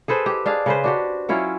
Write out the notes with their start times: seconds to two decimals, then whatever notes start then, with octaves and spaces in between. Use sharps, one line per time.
0.08 G#4 A4 B4 C5
0.26 G4
0.46 D4 G#4 F5
0.66 C#3 B4 C5
0.84 D4 F#4 G4
1.29 F#3 C#4 E4 F4